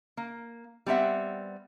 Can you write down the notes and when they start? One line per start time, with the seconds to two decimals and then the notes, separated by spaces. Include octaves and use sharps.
0.17 A#3
0.86 G3 B3 C4 E5 F#5